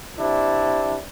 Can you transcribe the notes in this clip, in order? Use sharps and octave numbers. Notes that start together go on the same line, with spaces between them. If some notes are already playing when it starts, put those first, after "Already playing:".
C3 D4 E4